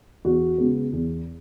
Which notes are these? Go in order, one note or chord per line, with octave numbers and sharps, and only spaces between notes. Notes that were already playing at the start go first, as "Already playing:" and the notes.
E2 F#4
C#3 G#3 B3
E2